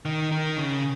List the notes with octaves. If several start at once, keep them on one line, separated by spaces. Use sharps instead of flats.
D#3
D#3
C#3